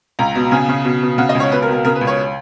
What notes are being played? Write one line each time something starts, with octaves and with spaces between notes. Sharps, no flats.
C#2 A#5
B2
C#3 G#5
C#3
B2
B2
C#3 F#5
D#5
C#2
C#5
B2 B4
A#4
B2
A#4
C#3 A#4
B4
C#2
C#5